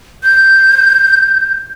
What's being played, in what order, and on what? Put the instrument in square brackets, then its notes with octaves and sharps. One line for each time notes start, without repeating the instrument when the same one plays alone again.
[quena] G6